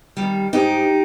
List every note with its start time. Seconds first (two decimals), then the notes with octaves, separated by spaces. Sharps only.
0.17 D#3 G3
0.53 G#2 D#4 G4